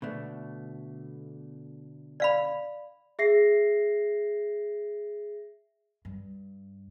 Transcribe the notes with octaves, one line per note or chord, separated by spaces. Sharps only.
B2 D3 A3
D5 F5 B5
G#4 E5 A#6 C7
G2